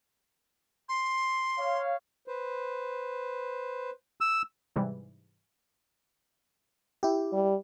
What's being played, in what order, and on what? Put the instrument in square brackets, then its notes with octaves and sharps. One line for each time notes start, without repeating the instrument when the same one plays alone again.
[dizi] C6
[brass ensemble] C#5 F5
[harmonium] B4 C5
[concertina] E6
[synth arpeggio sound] G#2 C3 E3 G3
[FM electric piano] E4 G4
[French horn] G3